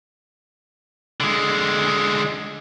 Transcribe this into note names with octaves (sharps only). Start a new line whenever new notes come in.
D3 G#3